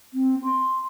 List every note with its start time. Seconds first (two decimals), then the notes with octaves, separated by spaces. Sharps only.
0.14 C4
0.43 C6